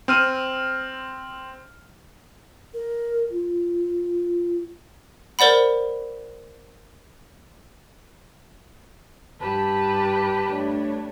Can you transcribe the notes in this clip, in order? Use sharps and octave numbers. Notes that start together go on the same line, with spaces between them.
C4 F6 D#7
A#4
F4
A#4 C5 D5 F#5 B5
G2 G4 B4 A5
A3 D4 C#5